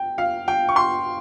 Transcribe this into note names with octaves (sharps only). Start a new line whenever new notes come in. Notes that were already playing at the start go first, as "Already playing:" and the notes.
Already playing: G5
F5
G5
C#6
C6